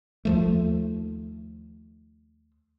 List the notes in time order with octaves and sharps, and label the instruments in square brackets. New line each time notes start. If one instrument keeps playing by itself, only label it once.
[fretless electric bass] D#2 F3 A3